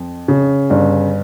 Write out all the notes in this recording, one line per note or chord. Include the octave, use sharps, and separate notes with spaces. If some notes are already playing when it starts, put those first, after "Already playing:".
Already playing: F2
C#3
G1